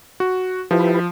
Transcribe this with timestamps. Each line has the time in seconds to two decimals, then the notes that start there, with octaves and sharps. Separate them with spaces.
0.20 F#4
0.71 F3 E4 G4 B4